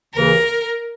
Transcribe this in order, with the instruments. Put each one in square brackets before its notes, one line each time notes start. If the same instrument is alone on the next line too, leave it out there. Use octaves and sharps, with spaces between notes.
[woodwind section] D#2 C#3 E3 [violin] A#4